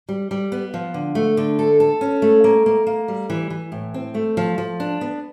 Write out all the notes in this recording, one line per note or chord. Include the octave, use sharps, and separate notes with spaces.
G3
G3
B3
F3
D3
A3
D3
A4
A4
C#4
A3
A#3
A#3
A#3
G3
E3
E3
A2
C4
A3
F3
F3
D4
B3